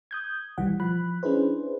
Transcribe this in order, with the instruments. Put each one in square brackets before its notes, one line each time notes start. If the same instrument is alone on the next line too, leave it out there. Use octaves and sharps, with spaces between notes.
[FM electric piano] D#6 G6 G#6
B1 E3 G3 F#5
F3 B5 F#6
C#4 D4 E4 G#4 B4 C5